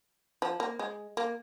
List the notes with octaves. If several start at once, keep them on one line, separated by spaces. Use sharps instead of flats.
F3
A#3
G#3
A#3